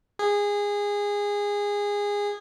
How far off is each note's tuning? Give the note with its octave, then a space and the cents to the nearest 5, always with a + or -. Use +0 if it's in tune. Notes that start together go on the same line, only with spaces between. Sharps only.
G#4 -20